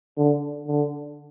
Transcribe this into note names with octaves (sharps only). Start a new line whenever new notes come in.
D3
D3